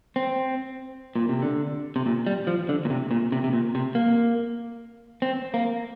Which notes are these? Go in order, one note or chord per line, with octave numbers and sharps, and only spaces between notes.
C4
A#2
C3
D3
C3
A#2
G3
F3
D3
A#2
C3
A#2
C3
C3
A#2
C3
A#3
C4
A#3